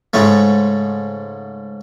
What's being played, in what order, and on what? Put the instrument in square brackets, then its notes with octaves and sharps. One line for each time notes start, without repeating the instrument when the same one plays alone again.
[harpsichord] G#2 C#3 A3